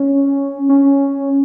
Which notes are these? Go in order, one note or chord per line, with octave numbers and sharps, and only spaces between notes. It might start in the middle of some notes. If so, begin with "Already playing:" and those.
Already playing: C#4
C#4